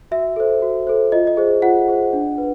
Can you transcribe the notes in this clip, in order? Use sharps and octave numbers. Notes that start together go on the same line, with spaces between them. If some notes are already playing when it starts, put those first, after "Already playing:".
F#4 E5
A4 C5
F#4
A4 C5
F4 D#5
D#5
G#4 C5
F4 F#5
G#4 C5
D4
B4